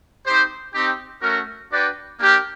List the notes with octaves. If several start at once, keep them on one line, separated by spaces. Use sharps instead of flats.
C4 D#4 G4 C5
C4 D#4 G4
A3 C#4 F#4 A#4
D4 F#4 B4 D5 G5
A#3 D4 G4 A#4